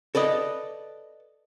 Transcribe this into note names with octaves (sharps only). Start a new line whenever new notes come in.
A4 B4 D5 D#5